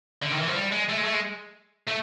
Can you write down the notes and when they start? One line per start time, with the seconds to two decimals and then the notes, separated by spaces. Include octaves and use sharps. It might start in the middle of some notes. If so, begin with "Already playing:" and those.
0.23 D3
0.31 D#3
0.40 E3
0.48 F3
0.56 G3
0.72 G#3
0.89 A3
0.98 G#3
1.05 A3
1.14 G#3
1.87 A3